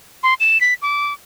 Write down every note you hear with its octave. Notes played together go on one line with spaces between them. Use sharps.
C6
E7
B6
D6